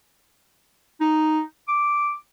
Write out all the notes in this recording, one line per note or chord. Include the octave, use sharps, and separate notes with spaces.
D#4
D6